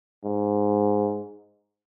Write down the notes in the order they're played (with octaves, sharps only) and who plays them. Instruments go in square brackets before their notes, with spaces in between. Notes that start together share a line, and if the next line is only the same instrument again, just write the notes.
[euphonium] G#2